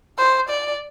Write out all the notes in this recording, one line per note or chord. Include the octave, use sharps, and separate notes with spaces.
C5
D5